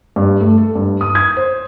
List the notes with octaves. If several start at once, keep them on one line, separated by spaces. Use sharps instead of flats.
G2
A3
A4
G2
D#6
G#6
C5